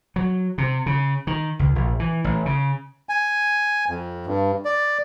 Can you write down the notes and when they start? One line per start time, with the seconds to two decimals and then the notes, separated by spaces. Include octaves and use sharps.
0.16 F#3
0.58 C3
0.86 C#3
1.27 D#3
1.59 C#2
1.75 A#1
2.00 E3
2.24 A1
2.46 C#3
3.09 G#5
3.89 F2
4.27 G2
4.65 D5